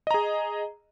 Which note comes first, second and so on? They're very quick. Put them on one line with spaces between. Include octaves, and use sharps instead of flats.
D#5 A#5 G#4